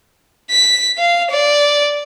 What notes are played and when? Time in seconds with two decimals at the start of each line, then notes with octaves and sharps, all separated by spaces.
0.50 B6
0.98 F5
1.31 D5